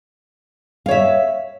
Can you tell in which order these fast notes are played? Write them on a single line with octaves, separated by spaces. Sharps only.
F5 C#5 E5